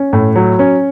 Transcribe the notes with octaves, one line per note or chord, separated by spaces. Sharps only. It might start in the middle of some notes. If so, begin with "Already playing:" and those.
Already playing: C#4
A2
F#3
C#4